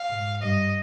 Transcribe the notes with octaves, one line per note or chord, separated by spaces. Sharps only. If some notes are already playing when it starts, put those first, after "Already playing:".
Already playing: F5
G#2
G2 D#5